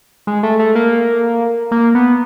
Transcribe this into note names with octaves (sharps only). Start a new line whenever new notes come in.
G#3
A3
A3
A#3
A#3
B3